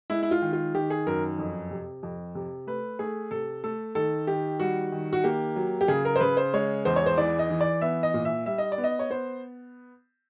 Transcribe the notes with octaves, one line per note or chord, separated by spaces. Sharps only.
G#3 E4
E4
F4
D#3
F4
D#3 G4
G#4
F#2 A#4
F2
C3
F2
C3
A3 B4
A3 G#4
C3 A4
A3 A4
D#3 A4
D#3 G4
G3 F#4
D#3
F#4
A#3 G4
F#3
G4
C#3 G#4
A#4
C5
C#3 B4
C5
G#3 C#5
E2 C5
C#5
C5
E3 D5
D#5
E3
D5
B3 E5
D#5
A#2
E5
G3 E5
D#5
D5
B3
D#5
C#5
B3 C5